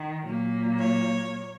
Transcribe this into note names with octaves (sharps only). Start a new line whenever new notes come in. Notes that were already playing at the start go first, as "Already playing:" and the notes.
Already playing: D#3
A#2 F#3 A#3
C#5